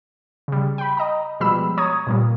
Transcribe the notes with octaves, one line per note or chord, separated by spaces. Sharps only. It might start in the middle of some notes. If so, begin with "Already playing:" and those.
C#3 G3
G5 B5
D#5 A#5
B2 F3 G3 G#3 B5 E6
C#5 A#5 D#6 G#6
A#2 G3 A#3